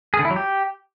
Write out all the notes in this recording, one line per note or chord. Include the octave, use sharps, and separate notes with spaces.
G#4
D3
E4
F#3
G4